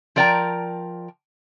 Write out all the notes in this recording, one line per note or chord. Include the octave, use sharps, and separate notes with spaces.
F3 A#4 D5 G5 A5 A#5